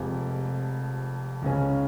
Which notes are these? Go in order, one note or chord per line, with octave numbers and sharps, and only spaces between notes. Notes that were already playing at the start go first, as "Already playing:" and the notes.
Already playing: F1 F2 C3 F3 G#3
C#2 C#3 G#3 C#4